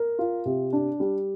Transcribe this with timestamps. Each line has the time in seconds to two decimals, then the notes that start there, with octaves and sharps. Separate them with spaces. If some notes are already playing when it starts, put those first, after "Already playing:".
Already playing: A#4
0.19 F4
0.45 C3
0.73 D4
1.00 G3